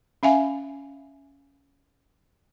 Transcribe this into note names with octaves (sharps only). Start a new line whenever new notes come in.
C#4 E5 F5 G#5